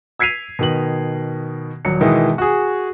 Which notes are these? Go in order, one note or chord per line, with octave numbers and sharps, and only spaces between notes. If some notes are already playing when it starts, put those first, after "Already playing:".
E6 G#6 B6 C7 D#7 F7
B2 D#3 F#7
D#1 F#3 C#7
B2 D#3 E3 G#3 B3
F#4 G#4